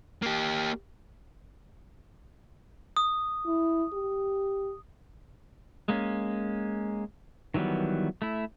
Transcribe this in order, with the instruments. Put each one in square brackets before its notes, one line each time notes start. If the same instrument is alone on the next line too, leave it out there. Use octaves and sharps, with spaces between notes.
[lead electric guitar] A#3 G4
[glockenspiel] D#6
[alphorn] E4
G4
[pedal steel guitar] G#3 A#3 C#4
D#3 E3 F#3 G3 B3
A3 E4